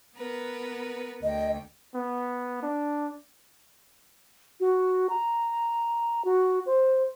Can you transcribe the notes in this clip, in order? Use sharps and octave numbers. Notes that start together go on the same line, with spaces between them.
B3 A#4 B4
D2 D#5 G5
B3
D4
F#4
A#5
F#4
C5